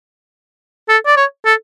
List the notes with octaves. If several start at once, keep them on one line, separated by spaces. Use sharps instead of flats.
A4
D5
C#5
A4